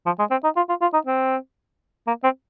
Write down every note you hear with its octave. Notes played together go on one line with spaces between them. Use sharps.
F3
G#3
C4
D#4
F4
F4
F4
D#4
C4
A#3
C4